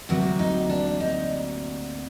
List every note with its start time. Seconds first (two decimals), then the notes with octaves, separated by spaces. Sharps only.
0.09 D2 C3 F#3 A#3 F#4
0.39 D#4
0.70 D4
1.00 D#4